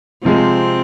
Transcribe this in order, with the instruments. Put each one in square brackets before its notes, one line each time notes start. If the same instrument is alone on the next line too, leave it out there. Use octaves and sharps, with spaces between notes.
[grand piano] C3 F3 G#3 [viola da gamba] C4